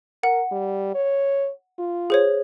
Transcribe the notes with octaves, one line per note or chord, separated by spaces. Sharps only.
A#4 F#5
G3
C#5
F4
G#4 C5 C#5